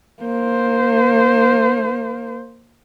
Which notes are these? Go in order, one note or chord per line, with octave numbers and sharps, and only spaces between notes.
A#3 C5